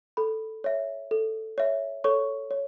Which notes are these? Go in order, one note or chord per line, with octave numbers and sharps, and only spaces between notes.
A4 B5
C#5 E5
A4
C#5 E5
A4 C#5 C#6
C#5